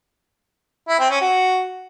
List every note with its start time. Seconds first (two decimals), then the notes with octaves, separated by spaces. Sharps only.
0.88 E4
0.99 C4
1.10 C#4
1.21 F#4